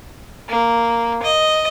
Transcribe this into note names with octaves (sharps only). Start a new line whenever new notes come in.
A#3
D#5